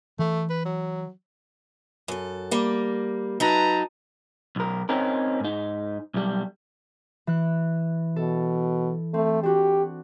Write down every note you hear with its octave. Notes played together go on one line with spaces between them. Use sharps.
E3 A3
B4
F#3
F#2 A4
G3 A#3
F#3 D#4 B4 A5 A#5
B1 A#4
C4 C#4 D#4 A#4
G#2 D#4
B1 G3
E3 F#6
B2 A4
A3 C4
D4 F#4 G4